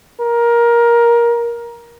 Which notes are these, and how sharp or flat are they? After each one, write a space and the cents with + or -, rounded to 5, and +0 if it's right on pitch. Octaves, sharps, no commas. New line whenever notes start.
A#4 +15